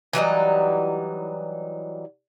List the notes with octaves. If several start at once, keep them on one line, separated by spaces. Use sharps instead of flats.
E3 F#3 G3 D#4